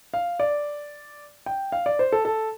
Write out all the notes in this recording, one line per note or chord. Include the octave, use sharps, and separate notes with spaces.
F5
D5
G5
F5
D5
C5
A4
A4